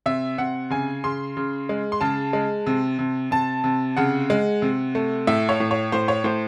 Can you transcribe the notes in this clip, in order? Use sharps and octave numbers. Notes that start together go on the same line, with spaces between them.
C3 E5
C3 F#5
C#3 G#5
C#3 C6
C#3
G#3
C6
C#3 A5
G#3
C3
C3
C3 A5
C3
C#3 F#5
G#3
C3
A3
A2 E5
C#5
A2
C#5
A2 C5
C#5
A2 C5